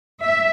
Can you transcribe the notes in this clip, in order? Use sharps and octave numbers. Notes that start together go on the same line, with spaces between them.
E5